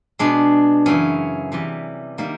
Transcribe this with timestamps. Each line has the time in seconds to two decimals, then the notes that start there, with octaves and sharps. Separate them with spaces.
0.19 B2 G#3 D4
0.86 F#2 C#3 E3 C#4
1.52 C3 E3 G3
2.18 D#3 G3 A#3